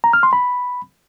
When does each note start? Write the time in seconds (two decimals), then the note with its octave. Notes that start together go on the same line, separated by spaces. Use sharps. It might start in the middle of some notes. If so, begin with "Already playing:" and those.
0.04 A#5
0.13 F6
0.23 C6
0.33 B5